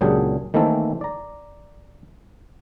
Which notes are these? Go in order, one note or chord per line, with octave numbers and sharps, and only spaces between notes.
C#2 A#2 F#3 D4 G4 G#4
D#3 E3 A3 A#3 C4 A4
D5 A#5